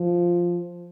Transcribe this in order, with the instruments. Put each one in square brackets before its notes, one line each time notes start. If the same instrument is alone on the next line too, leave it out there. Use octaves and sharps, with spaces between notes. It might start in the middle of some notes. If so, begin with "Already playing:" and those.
Already playing: [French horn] F3